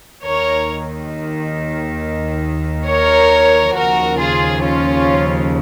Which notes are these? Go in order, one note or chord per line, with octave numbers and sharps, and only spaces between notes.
D#2 D#3 A#4 C#5
A#4 C#5
D#2 C#3 F3 F#4 A#4
F4 G#4
C#4 F4